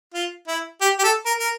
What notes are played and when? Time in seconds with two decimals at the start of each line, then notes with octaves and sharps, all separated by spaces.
0.14 F4
0.48 E4
0.81 G4
0.99 G4
1.04 A4
1.26 A#4
1.40 A#4